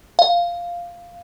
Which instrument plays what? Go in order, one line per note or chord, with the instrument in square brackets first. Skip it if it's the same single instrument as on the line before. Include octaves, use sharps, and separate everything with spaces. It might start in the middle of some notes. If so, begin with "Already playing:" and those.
[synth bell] F5